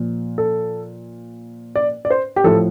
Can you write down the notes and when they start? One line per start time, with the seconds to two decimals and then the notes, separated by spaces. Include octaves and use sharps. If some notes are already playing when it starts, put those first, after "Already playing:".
Already playing: A#2 F3
0.38 A4
1.76 D5
2.05 D5
2.11 C5
2.36 G4
2.44 A2 F3 A4